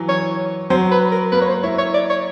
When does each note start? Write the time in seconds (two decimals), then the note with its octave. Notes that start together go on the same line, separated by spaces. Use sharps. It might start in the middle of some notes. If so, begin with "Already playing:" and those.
Already playing: E3 F#3
0.09 C#5
0.70 F#3 C5
0.91 B4
1.12 A#4
1.32 A#3 B4
1.41 C#5
1.48 C5
1.63 E4 C#5
1.78 C#5
1.94 D5
2.10 C#5